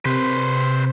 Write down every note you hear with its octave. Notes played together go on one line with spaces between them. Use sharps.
C3 B4 C5